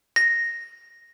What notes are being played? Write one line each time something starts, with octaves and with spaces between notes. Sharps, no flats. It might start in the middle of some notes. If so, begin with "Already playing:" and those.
A#6